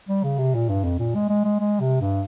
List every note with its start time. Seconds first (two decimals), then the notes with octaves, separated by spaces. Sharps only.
0.09 G3
0.24 C#3
0.38 C3
0.55 A#2
0.69 G2
0.84 F2
0.99 A#2
1.15 G#3
1.30 G#3
1.45 G#3
1.61 G#3
1.81 C3
2.01 G2